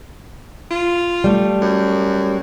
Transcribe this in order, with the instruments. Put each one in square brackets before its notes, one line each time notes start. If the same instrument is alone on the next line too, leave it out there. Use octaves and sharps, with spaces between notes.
[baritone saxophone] F4
[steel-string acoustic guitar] G3 A3
[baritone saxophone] F#2